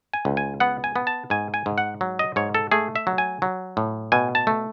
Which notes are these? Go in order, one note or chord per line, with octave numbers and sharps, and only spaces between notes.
G#5
C#2
G#5
B3 F#5
G#5
B3
A5
G#2 G#5
G#5
G#2
F#5
F#3
D#5
G#2 C#5
A4
A3 G#4
E5
F#3
G#5
F#3
A2
B2 G#5
A5
A3